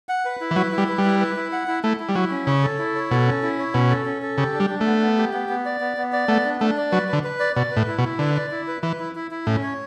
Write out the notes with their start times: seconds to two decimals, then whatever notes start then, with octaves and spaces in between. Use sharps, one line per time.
0.09 F#5
0.25 B4
0.41 E4
0.51 E3
0.56 F#3 B4
0.72 E4
0.78 G3
0.88 B4
0.98 G3
1.04 E4
1.21 B4
1.37 E4
1.52 F#5
1.68 E4
1.84 A3 E4
2.00 E4
2.09 G3
2.15 F#3 E4
2.31 C#4
2.47 C#3 C#5
2.63 A4
2.79 E4
2.95 C#5
3.11 B2 A4
3.27 C#4
3.43 E4
3.59 C#5
3.74 B2 C#4
3.90 A4
4.06 C#4
4.22 A4
4.38 C#3 G4
4.54 D4
4.60 G3
4.69 D4
4.81 A3
4.86 B3
5.01 B3
5.18 G4
5.33 B3
5.49 B3
5.65 D5
5.80 B3
5.97 B3
6.12 D5
6.28 A3 B3
6.45 D4
6.61 A3 D4
6.77 D5
6.92 F#3 B4
7.08 D3 B4
7.24 B4
7.39 D5
7.56 B2 D5
7.71 B4
7.76 A2
7.87 E4
7.98 B2
8.04 E4
8.19 D3 B4
8.36 D5
8.51 E4
8.68 B4
8.83 E3 B4
8.99 E4
9.15 E4
9.31 E4
9.47 A2 C#4
9.62 C#5